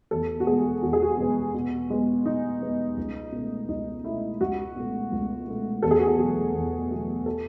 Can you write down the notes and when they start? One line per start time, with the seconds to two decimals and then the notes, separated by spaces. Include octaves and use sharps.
0.11 E2 A4
0.40 F#4
0.47 B2 G#3 B3 G#4
0.83 E2 F#4
0.93 G#4
1.02 F#4
1.18 B2 G#3 B3
1.54 B2
1.90 G#3 B3
2.25 B2 D#4
2.62 G#3 B3
2.97 C#2
3.32 B2 A3
3.68 C#2 D#4
4.04 B2 A3 E4
4.40 C#2 F#4
4.76 B2 A3
5.12 C#2
5.48 B2 A3
5.82 E2 A4
5.91 G#4
5.99 F#4
6.07 G#4
6.18 B2 F#3 A3
6.54 E2
6.91 B2 F#3 A3
7.26 A4